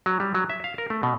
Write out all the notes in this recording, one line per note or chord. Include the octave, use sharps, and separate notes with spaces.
F#3
G3
F#3
E5
F5
A#4
A3
B2